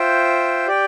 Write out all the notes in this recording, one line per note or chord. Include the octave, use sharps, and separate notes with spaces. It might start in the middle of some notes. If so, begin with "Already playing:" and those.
Already playing: F4 C5 E5 G5
G4 D5 G5